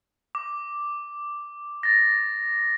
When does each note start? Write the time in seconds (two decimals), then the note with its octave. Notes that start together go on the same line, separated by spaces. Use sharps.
0.35 D6
1.83 A6 A#6